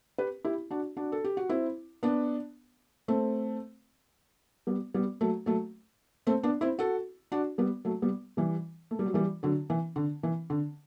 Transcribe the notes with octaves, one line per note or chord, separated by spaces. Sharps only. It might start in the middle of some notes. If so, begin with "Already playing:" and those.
G4 B4
E4 G4
D4 F#4
D4 F#4
A4
G4
F#4
C4 E4
B3 D4
A3 C4
G3 B3
G3 B3
F#3 A3
F#3 A3
A3 C4
B3 D4
C4 E4
F#4 A4
D4 F#4
G3 B3
F#3 A3
G3 B3
E3 G3
A3
G3
F#3
E3 G3
D3 F#3
E3
D3
E3
D3